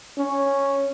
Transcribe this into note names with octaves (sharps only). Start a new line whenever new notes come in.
C#4